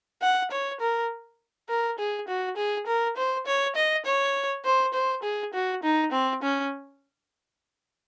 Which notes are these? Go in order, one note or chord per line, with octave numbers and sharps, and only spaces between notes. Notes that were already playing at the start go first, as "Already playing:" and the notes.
F#5
C#5
A#4
A#4
G#4
F#4
G#4
A#4
C5
C#5
D#5
C#5
C5
C5
G#4
F#4
D#4
C4
C#4